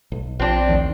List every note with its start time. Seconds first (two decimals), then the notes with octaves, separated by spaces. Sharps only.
0.12 B1
0.40 A#1 F3 C4 D4
0.68 A1 D#2 D#3